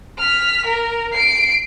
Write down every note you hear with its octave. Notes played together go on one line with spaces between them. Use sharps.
F6 B6
A#4
C7 D7